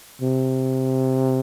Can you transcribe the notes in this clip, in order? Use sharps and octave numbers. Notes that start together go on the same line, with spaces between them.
C3